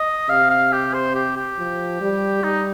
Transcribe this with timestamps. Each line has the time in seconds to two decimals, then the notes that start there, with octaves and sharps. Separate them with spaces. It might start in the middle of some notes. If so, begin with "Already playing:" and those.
Already playing: D#5
0.29 C3 F5
0.50 F5
0.73 G4
0.94 C5
1.15 G4
1.37 G4
1.58 F3
2.01 G3
2.43 G3 D#4